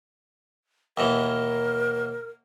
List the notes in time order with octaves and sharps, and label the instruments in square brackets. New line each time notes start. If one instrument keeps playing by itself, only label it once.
[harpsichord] D#2 B2 E3 [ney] A#4